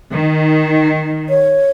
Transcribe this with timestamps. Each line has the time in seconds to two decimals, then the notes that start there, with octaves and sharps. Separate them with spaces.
0.10 D#3
1.30 C#5